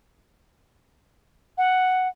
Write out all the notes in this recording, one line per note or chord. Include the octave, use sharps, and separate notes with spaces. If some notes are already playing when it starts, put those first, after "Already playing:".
F#5